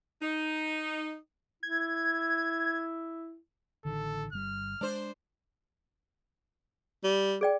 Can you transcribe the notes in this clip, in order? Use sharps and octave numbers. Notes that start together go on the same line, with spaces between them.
D#4
E4 G#6
A1 D3 D#3 A4
G1 G3 F6
G#3 D4 C5
G3
G#4 D5 G5